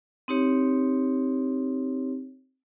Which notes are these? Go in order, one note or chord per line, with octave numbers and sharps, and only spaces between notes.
C4 D#4 G4 C#5